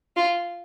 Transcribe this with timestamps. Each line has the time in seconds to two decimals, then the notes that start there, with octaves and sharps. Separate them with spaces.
0.17 F4